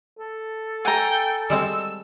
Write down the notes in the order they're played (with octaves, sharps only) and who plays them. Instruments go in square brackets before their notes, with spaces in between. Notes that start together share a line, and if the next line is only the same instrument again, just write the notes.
[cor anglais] A4
[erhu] G5 [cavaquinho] G#5 A#5
[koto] G3 G#3 C4 [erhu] E6